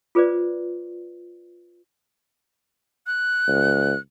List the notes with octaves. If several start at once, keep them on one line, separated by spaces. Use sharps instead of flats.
F4 G#4 B4 C5 D5
F#6
C#2